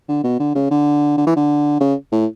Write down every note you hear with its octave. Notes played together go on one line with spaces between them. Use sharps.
D3
B2
D3
C#3
D3
D3
E3
D3
C#3
A2